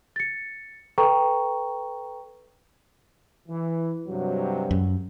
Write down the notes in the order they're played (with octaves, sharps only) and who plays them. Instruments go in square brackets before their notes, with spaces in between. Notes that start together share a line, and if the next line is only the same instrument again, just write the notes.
[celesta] A6 C#7
A4 B4 G5 A#5 C#6
[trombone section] E3
G2 C3 F#3
[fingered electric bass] F#2